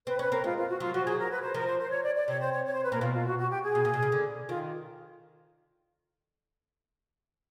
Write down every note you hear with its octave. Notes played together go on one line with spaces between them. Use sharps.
C4 B4
C#4 B4
C4 A#4
G#3 F4
F4
F#4
F#3 F4
F3 F#4
F#3 G#4
A#4
B4
C5
F3 A#4
C5
C5
C#5
D5
D5
C3 C#5
C5
C#5
C#5
C5
B4
A#2 A#4
B2 F4
F4
F#4
F#4
G4
G#4
B2
A#2
B2
C#3
D3
D#3 F4